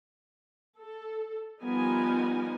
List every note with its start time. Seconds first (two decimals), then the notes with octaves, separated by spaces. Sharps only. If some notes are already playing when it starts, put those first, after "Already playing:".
0.80 A4
1.62 F3 G3 B3 D#4 A#4 G#5